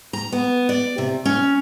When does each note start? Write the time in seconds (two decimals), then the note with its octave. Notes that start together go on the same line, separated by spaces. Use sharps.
0.13 A#5
0.32 B3
0.69 D5
0.98 C3
1.25 C#4